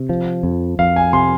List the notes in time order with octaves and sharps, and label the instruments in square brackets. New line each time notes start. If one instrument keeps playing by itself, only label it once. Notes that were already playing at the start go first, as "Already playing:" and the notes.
Already playing: [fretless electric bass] C3
F3
F2
[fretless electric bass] F2 [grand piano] F5
[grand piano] G#5
[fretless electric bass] C3 [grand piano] G#5 C6